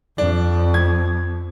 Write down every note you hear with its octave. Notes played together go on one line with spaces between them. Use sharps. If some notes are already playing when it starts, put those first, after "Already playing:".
F2 D4
G#6